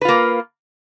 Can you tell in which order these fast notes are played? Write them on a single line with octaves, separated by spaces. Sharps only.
B4 F4 A#3